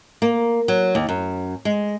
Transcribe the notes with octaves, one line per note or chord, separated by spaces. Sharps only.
A#3
F#3
D#2
F#2
G#3